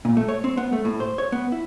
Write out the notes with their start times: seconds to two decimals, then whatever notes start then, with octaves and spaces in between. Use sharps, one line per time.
0.05 A#2
0.17 A3
0.29 C#5
0.44 C4
0.57 B3
0.72 A3
0.85 A2
1.00 C5
1.18 C#5
1.32 B3
1.52 E4